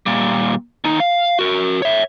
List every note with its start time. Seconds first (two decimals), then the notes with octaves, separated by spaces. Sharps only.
0.06 A#2 G3
0.84 D#2 D#4
1.00 F5
1.39 F#4 A#4
1.82 C#5 E5